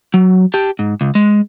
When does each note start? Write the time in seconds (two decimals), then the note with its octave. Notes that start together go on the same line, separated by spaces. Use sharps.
0.14 F#3
0.54 G4 A5
0.79 G#2
1.01 C#2
1.15 G#3